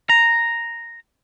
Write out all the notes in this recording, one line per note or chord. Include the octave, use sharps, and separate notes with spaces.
A#5